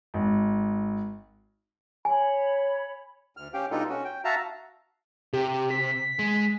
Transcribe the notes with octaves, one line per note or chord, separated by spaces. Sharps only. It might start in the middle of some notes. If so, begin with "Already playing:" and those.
G#1
C#5 G#5 B5
D2 F6
C#4 G4 F5 G5
B2 G3 D4 D#4 F4 A4
C#4 F#4
G5
F#4 E5 F5 A5 A#5
C3 G4
B6
G#3